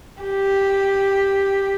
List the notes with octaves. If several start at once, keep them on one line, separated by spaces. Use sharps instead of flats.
G4